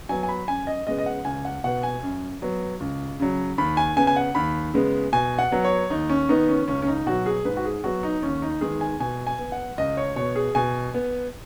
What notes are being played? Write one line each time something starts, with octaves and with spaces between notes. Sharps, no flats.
F#3 B3 G#5
G#5
B5
F#2 G#5
D#5
C#3 G#3 B3 D#5
D#5
F#5
C#2 G#5
F#5
B2 B3 F#5
G#5
F#2
F#3 B3
C#2
C#3 F#3
D#2 B5
G#5
C#3 B3 G#5
G#5
F#5
D#2 B5
C#3 G#3 B3
B2 G#5
F#5
F#3 B3
C#5
D#2 D#4
C#4
D#3 B3 D#4
C#4
C#2 C#4
C#4
D#4
B2 F#3 F#4
G#4
G#2 B4
F#4
G#4
F#3 B3 F#4
D#4
D#2 C#4
D#4
D#3 G#3 B3 G#4
G#5
B2 G#5
G#5
B3
F#5
C#2 D#5
C#5
B2 B3 C#5
G#4
B2 G#5
B3